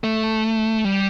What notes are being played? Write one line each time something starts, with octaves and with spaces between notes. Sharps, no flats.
A3
G3